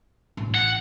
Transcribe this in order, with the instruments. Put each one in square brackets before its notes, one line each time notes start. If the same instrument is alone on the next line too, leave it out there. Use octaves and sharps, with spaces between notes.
[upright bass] A1
[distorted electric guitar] F#5